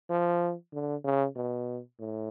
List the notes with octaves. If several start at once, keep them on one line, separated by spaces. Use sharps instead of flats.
F3
D3
C#3
B2
A2